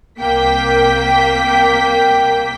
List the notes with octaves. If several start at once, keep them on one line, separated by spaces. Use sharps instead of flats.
C2 A#3 G5 B6